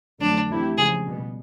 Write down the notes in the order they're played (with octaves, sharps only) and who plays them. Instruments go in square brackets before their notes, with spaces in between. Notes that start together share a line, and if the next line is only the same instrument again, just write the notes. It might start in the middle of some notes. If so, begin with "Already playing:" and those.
[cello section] F2 D3 F#3 A3 [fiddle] D4
[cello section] E3 A3 C4 E4 G4
[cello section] C#3 F3 G#3 [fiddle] G#4
[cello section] B2 G3 B3